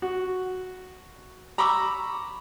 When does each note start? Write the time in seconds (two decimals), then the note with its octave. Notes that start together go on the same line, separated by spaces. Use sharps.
0.02 F#4
1.58 A#5 B5 C#6 D6 E6